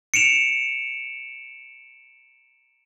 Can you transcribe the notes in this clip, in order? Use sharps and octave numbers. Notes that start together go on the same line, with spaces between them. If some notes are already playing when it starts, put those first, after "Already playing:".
C#7 D7 E7 F7